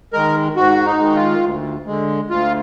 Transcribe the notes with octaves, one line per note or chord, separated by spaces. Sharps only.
D#3 G#3 A#4
G#2 F#4
D#4
D#3 G#3
F4
D2
D3 G#3
D2 F4